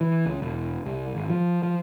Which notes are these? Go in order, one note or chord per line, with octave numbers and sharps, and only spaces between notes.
E3
C#2
E1
C2
G#1
F3
F3